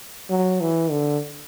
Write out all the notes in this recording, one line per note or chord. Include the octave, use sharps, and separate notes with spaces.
F#3
E3
D3